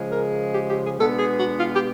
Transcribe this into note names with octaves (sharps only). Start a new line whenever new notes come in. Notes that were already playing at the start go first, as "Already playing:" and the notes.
Already playing: C#3 F3 G#3
A#4
G4
G4
G#4
B2 G#3 B3 D4 A4
G#4
F#4
F4
G4